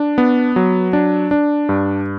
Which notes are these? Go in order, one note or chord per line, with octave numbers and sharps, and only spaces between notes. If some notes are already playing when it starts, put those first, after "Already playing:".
Already playing: D4
B3
F#3
D4
D4
G2